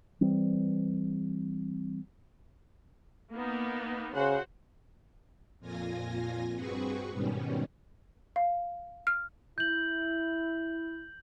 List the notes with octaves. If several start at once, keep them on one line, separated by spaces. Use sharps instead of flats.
E3 G3 C4
A#3 B3 D#4
C#3 F#4 C5 F#5
F2 A#2 F4 G#5 A#6
G2 C4 F#4 G#4 B4 C#6
G#2 B2 D#3 G3 C#4
F5
F6
E4 G6 F#7